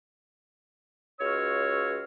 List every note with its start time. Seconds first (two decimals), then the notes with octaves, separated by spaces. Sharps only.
1.19 C#2 F#4 C#5 F5 E6